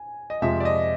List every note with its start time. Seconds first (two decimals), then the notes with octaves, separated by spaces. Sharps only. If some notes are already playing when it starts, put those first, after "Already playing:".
Already playing: G#5
0.30 D#5
0.42 F2 C3 F3 G#3 E5
0.60 D5
0.65 D#5